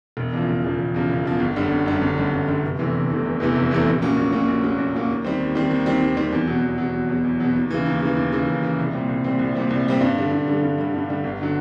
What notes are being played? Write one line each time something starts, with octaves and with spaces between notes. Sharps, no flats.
E1
E2 C#3 F3
E1
E2 C#3 F3
E1
E2 C#3 F3
E1
E2 C#3 F3
G1
F#2 D3 G3
G1
F#2 D3 G3
G1
F#2 D3 G3
G1
F#2 D3 G3
F1
E2 C3 E3 A3
F1
E2 C3 E3 A3
F1
E2 C3 E3 A3
F1
E2 C3 E3 A3
A#1
A#2 F#3 A#3 C#4
A#1
A#2 F#3 A#3 C#4
A#1
A#2 F#3 A#3 C#4
A#1
A#2 F#3 A#3 C#4
D#2
D#3 G3 C4
D#2
D#3 G3 C4
D#2
D#3 G3 C4
D#2
D#3 G3 C4
E2
B2 F#3
E2
B2 F#3
E2
B2 F#3
E2
B2 F#3
D#2
C#3 E3
D#2
C#3 E3
D#2
C#3 E3
D#2
C#3 E3
C2
A#2 G3 C4
C2
A#2 G3 C4
C2
A#2 G3 C4
C2
A#2 G3 C4
G2
D3 G3
G2
D3 G3
G2
D3 G3
G2
D3 G3
G1
D3 F#3